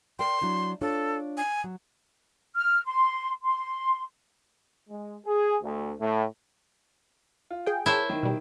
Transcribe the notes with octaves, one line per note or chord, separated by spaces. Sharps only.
A#4 D5 G5 C6
F#3 D4 E4
D4 F4 A4 C#5
G#5
F#3
F6
C6
C6
G#3
G#4
D2
A2
F4
G#4 G5
E4 A#4 C5 C#5 E5 A5
D#3
B2 G3